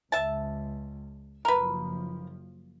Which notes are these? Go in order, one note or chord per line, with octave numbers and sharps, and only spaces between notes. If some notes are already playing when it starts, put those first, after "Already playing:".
C#2 E5 A5
F#1 F3 A#4 B4